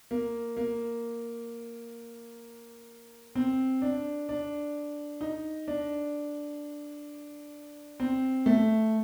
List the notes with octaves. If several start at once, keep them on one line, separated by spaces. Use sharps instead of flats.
A#3
A#3
C4
D4
D4
D#4
D4
C4
A3